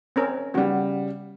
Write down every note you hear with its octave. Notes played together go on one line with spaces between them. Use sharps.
C4 C#4 A#4
C#3 G3 B3 F#4